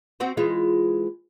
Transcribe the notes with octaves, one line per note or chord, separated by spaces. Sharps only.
C4 F#4 C5
E3 G#3 F4